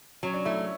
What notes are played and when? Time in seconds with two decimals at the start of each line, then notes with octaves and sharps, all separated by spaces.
0.23 F#3 C#4
0.34 D4
0.45 A3 E4
0.57 E4